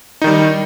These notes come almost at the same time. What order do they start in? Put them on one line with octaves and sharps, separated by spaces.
D#4 D#3 G3